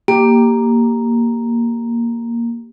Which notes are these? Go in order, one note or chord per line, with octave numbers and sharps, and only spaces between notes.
A#3 G4